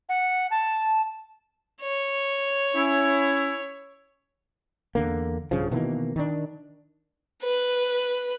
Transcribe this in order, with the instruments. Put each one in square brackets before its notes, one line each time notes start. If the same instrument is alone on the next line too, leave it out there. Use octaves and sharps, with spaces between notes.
[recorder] F#5
A5
[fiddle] C#5
[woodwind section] C#4 E4
[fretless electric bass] E2 D3 A#3
B1 G2 C#3 F3
B2 D#3 E3 A#3
D#3 D4
[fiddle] B4